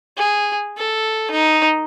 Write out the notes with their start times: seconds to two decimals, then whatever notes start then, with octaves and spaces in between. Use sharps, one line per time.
0.17 G#4
0.77 A4
1.31 D#4